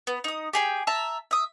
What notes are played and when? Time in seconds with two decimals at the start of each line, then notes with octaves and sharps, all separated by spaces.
0.07 B3
0.24 D#4 D#6
0.53 G4 G#4 G5
0.87 E5 A5 A#5
1.31 E5 D#6